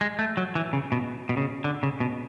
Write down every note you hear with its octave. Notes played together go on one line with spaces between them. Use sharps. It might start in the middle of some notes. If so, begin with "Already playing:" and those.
G#3
A3
F#3
E3
C#3
B2
B2
C#3
D3
C#3
B2